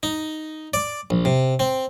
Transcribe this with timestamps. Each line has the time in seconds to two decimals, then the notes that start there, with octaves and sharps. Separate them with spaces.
0.03 D#4
0.74 D5
1.10 A#1
1.25 C3
1.60 C4